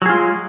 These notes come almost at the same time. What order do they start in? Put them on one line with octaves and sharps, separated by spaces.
F#3 G#4 F4 G#3